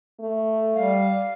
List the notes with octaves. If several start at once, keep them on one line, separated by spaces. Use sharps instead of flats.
A3
G3 F5